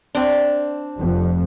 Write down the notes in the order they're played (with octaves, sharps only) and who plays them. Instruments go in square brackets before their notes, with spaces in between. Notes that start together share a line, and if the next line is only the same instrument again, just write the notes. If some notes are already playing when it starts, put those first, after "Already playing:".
[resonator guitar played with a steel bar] C4 D4
[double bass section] F1 F2